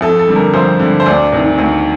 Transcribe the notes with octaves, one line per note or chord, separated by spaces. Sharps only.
F2 A4
A4
D3 G3
A#4
F2 C5
D3 G3
C5
D2 D5
C3 D#3
D2